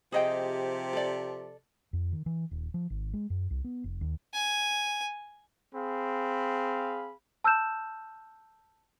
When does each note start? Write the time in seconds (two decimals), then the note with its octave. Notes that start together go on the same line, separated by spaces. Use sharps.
0.12 C3 F3 G4 G#4 D#5 G5
0.93 A4 D5
1.93 F2
2.12 D#3
2.26 E3
2.51 D#1
2.74 F3
2.90 G#1
3.13 G#3
3.30 F#2
3.50 C2
3.64 B3
3.84 F1
4.01 D#2
4.34 G#5
5.75 C4 G#4 F5 B5
7.44 A5 E6 F6 G6 E7